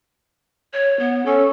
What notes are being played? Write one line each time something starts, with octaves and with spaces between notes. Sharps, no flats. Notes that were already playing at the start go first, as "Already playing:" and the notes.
C#5
B3
C#4 A4